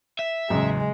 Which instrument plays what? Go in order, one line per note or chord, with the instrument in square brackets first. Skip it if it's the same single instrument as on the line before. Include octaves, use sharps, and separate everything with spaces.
[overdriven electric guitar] E5
[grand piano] A1 E2 A#5 [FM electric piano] C#3 F#3 [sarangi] G#3